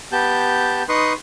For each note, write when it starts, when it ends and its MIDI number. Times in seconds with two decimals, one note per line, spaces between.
0.12 0.82 59
0.12 0.82 67
0.12 0.82 81
0.12 0.82 91
0.89 1.12 63
0.89 1.12 71
0.89 1.12 84
0.89 1.12 85
0.89 1.12 87